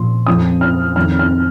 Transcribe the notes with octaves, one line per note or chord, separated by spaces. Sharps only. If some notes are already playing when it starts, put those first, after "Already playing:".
Already playing: A#2 F3 C6
F2 F3 D#6
F6
F2 D#3 F6
F6